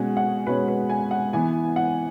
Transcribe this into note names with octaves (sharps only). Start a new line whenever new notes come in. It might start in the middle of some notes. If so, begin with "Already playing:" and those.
Already playing: B2 G#3 C#4 F#5 G#5
F#5
B2 G#3 C#4 B4
B4
G#5
F#5
E3 B3 G#5
F#5